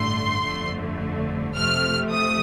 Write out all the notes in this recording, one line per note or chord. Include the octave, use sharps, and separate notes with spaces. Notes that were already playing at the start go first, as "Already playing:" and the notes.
Already playing: A1 G2 D3 A3 C6
G1 F2 D3 A3
F2 C3 F3 A3 F6
D#6